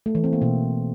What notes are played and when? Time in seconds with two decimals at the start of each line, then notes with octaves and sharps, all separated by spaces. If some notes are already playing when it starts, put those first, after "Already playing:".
0.06 A3
0.15 E3
0.24 C4
0.33 A#3
0.42 B2